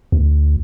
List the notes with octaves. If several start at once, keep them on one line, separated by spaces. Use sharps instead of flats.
D2